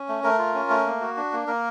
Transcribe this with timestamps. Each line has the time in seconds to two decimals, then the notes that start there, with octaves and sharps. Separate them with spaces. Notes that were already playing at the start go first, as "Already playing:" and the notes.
Already playing: C#4
0.09 A3
0.23 A3 A#4
0.39 F4
0.54 C#4
0.70 A3
0.86 A#3
1.01 F#4
1.17 D4
1.33 A#3
1.47 A#3 A#4